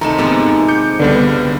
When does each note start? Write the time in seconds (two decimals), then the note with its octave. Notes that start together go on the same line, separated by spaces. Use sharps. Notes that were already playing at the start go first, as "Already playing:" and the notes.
0.01 C3 D#3 A3 D#4 A#5 E7
0.18 G#2 C3 F3 A#3 B3 F#4
0.68 D6 G6 C#7
1.00 C#2 G2 D3 G3 B3